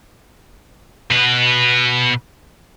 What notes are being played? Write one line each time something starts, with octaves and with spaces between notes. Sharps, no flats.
B2 B4